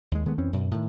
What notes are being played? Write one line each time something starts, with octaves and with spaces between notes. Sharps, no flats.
D#2 G#3
D#3 G#3 A3 B3
F2 E3 C4 C#4
F#2 B2
A2 D#3